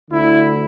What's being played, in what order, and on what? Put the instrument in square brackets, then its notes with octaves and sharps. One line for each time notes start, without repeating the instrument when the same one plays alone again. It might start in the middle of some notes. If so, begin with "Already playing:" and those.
[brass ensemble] D2 D3 E4